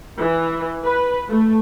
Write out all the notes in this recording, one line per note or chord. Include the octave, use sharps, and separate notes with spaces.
E3
B4
A3